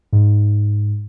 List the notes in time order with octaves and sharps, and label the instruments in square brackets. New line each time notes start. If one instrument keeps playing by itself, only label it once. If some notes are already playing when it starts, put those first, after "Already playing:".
[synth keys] G#2